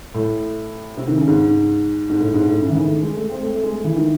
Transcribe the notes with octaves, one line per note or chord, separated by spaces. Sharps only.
A2
C3
D#3
C#3
G#2
G#2
A2
G#2
A2
C#3
E3
D#3
A3
G#3
A3
C4
A3
A3
G#3
E3
D#3